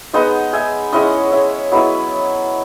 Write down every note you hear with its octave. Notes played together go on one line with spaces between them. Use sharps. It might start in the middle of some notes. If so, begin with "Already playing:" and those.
G#3 B3 D#4 D#5 F#5
E5 G#5
G#3 C#4 E4 D#5 F#5
C#5 E5
F#3 B3 E4 B4 D#5